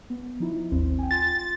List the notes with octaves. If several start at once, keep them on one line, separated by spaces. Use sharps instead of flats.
B3
F3 D#4 E4
G#1 D#2 C4
G5 G#5
F4 C6 A6